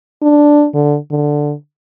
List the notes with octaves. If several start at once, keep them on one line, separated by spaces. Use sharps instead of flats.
D4
D3
D3